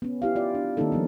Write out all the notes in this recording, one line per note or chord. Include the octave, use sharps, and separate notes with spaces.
B3 C#4
E4 G4 F5
F4 D5
D4
D#3 A#3 C4 C#4 D#4 A4
F3 G3 B3 C#4